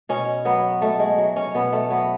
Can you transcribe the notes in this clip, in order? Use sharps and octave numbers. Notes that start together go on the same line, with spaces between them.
B2 C#4
F#3 B3
B2 A3
G#3
F#3
C#4
B2 B3
A3
F#3 B3